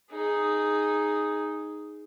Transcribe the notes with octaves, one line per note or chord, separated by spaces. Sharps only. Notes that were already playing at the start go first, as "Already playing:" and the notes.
D#4 G#4